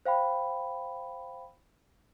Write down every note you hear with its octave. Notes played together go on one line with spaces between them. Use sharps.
C5 F5 G5 B5